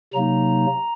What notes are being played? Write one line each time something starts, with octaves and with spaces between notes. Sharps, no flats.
C3 F#3 A#3 D#4 A#5